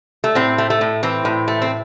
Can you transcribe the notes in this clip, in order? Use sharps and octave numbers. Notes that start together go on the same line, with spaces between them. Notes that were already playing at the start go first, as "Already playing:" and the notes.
A3
A2 C4
A3
A3
A2
E3 C4
A2
A3
C4